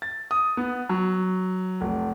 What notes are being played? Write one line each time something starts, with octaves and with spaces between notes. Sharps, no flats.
A6
D#6
B3
F#3
F1